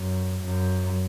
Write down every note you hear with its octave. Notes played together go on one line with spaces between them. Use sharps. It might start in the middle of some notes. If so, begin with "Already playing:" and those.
Already playing: F#2
F#2